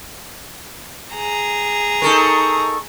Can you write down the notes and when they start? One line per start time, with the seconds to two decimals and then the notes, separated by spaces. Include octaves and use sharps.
1.15 G#4 A#5
2.02 D#4 A4 A#4 C#6